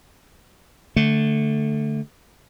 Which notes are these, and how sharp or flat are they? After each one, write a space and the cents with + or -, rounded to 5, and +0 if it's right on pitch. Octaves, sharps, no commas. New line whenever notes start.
D3 +0 A3 +0